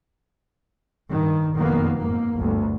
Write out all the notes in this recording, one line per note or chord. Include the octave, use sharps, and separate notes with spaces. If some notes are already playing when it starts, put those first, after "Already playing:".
G2 D#3
F#1 F2 B2 D#3 A#3 B3
G#2 A#3
G1 D2